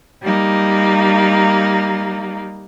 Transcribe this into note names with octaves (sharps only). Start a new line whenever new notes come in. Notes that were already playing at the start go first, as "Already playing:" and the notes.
G3 A#3 D#4